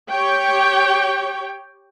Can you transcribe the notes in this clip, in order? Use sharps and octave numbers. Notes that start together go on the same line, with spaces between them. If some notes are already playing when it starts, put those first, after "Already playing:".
G4 C#5 G5